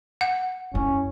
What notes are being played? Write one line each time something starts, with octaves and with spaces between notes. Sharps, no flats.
F#5
F#2 C#4 E4